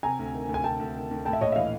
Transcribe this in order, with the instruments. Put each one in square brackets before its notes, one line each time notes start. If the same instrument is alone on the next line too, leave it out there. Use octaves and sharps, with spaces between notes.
[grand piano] C3 [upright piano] G#5 A#5
[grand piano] D2
D#3
D2
[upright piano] G#5
[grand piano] C3 [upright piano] G5 A5
[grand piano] D2
D#3
D2
[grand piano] A2 [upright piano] G5 A5
[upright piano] E5
[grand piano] A#1 [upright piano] C#5 D#5
[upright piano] E5
[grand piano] E3 [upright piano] D#5 F5